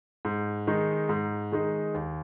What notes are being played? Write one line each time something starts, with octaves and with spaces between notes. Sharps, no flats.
G#2
D#3 G#3 D#4
G#2
D#3 G#3 D#4
D#2